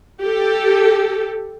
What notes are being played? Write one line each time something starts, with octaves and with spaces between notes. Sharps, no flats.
G4 A4